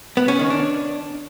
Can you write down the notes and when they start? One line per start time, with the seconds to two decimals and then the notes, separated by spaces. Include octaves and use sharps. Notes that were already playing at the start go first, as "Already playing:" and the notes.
0.17 B3
0.28 C#4
0.39 D#3
0.50 D4